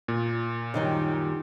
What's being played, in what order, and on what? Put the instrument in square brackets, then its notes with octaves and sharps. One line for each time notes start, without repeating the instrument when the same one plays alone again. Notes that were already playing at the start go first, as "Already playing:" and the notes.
[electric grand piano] A#2
[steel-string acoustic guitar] F#2 D#3 G3